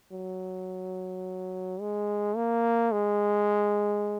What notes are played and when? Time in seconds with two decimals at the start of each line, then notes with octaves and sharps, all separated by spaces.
0.12 F#3
1.80 G#3
2.36 A#3
2.92 G#3